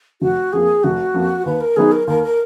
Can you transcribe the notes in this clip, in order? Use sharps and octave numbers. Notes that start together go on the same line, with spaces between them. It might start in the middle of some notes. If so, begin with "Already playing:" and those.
F1 F#4
F2 F3 A#3 G#4
F1 F#4
F2 F3 A#3
D#2 B4
A#4
D#3 F#3 B3 D#4 G#4
A#4
D#2 A#4
A#4